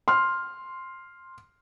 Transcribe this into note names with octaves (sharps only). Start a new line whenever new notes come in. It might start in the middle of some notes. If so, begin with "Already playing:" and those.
C6 F6